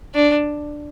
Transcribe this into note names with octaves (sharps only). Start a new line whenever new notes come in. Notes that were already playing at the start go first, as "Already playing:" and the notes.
D4